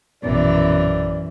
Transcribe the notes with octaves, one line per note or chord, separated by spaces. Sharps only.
A#1 F#2 B2 E3 B3 D5